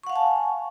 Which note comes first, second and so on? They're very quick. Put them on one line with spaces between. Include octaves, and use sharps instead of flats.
C#6 F#5 F5 G#5 A5